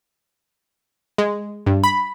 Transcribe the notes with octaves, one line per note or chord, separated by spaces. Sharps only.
G#3
G2
B5